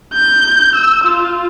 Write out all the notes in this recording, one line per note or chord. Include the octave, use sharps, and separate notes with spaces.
G6
E6
F4